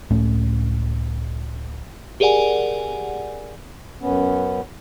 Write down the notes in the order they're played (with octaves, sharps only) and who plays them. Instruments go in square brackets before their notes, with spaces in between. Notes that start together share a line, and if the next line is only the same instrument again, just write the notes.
[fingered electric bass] C#2 A2 A3 C#4
[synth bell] G4 G#4 A#4 D5 F#5 G#5
[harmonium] F#2 B3 C#4